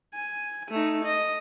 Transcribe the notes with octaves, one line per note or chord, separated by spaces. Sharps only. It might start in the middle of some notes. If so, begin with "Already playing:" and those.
G#5
A3 D#4
D#5